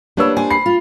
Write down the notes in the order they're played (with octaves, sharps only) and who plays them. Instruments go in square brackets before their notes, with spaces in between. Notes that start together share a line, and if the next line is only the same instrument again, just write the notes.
[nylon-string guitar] G3 A#3 D4 [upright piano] B4 C#5 E6
[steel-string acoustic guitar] C5 [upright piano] G#5
[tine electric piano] B5 [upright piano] C7
[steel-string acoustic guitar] F4